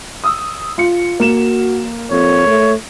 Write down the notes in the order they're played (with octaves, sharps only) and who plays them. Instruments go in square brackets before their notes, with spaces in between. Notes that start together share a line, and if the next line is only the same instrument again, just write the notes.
[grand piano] D#6 E6
F4 C#7
[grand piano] A#3 E7 [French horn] F#4
[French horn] F2 [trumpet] C#5
[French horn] A3